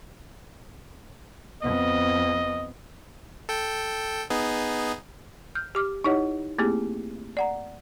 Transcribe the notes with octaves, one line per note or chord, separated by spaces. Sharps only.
F2 B3 D#5
A4 G5
B3 D#4 G#4
F6 G6
G4 D6 F6
D#4 E4 G4 C#5 D#5 F#5
A3 A#3 C4 E4 G4 G#4
D5 F#5 A#5